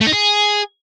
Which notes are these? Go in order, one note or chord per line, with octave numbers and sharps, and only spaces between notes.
A3
D#4
G#4